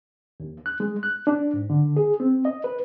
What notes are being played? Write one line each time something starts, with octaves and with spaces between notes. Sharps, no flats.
D#2
F#6
G#3
F#6
D4
G#2
D3
G#4
C4
D#5
B4